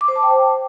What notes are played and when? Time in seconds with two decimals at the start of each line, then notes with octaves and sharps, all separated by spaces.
0.01 D6
0.08 C5
0.16 A5
0.23 G5